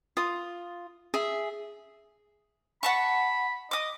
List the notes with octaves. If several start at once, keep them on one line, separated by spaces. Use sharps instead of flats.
F4 D#6
G#4 E5
F#5 A5 B5 C#6
D#5 D6 D#6